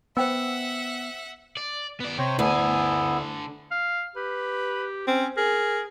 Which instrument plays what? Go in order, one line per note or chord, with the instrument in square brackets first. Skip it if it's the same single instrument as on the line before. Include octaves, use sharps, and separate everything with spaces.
[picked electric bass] B3 [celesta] C5 G5 E6 [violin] E5 F#5
[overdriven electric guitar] D5
B3 D5
[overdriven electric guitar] C3 [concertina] C5 C#5 G5
[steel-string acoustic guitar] D2 [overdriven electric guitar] D3 G#5 [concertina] B3 E4
[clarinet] F5
[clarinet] G4 [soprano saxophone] B4
[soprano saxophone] C4 [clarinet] C#4
[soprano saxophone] G#4 [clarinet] A#4